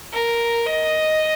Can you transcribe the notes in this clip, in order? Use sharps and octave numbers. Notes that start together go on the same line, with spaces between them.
A#4
D#5